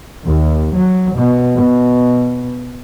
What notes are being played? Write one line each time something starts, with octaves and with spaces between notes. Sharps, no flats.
D#2
F#3
B2
B2